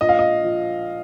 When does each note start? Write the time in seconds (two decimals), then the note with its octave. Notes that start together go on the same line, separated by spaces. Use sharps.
0.01 A#1 D#5
0.09 F5
0.19 D#5
0.44 F3